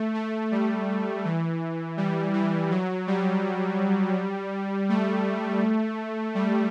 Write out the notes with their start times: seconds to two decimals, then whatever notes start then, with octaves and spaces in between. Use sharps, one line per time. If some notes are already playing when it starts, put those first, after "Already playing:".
Already playing: A3
0.14 A3
0.52 G3
1.25 E3
1.97 G3
2.34 E3
2.70 F#3
3.07 G3
4.89 A3
6.35 G3